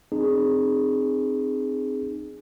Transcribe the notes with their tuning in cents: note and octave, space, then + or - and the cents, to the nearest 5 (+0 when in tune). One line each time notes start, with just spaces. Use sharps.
C4 +0 D#4 -35 G#4 +0